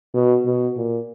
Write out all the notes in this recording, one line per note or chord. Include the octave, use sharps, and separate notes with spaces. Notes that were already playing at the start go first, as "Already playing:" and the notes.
B2
B2
A#2